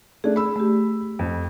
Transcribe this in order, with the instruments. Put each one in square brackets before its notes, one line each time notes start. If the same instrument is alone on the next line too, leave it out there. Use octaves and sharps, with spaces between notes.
[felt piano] A3 D4 [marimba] G#4
[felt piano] B5 E6
[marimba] A3 G4
[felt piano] F2